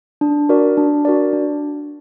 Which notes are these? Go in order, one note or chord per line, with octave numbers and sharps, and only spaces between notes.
D4
F#4 A#4 D5
D4
F#4 A#4 D5
D4